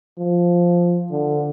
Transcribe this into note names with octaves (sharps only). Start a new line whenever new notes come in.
F3
D3